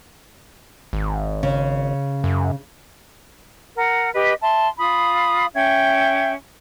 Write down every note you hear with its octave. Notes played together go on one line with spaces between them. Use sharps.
G#1
C#3
F#2
A#4 F#5
G4 B4 D#5
E5 A5 C6
F4 F5 B5 D#6
C#4 E5 G5 G#6